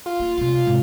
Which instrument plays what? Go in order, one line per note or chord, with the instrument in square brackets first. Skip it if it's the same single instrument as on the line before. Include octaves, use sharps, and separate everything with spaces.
[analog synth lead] F4
[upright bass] A#3
[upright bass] D2 C3 [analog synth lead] F4
[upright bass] G#2 C3